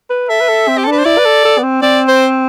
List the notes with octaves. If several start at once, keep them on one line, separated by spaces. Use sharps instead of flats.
B4
A4 E5
B4
A4
C4
G4
A4
D4 B4
C5
E4 D5
B4
A4
A4
B3
C4
C4 D5
C5